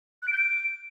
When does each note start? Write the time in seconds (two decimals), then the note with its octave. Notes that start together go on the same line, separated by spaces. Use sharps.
0.22 F#6
0.28 D7
0.33 G6
0.38 D7